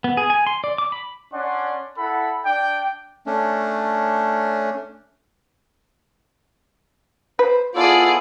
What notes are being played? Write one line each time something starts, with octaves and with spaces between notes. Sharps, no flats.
B3
G#4
G#5
C6
D5
D6
B5
C#4 D4 D5 F#5 C6
E4 A4 F#5 B5
D4 D5 G5
A3 C#4 D4
B4 C5
B3 E4 F4 G#4 A4 D5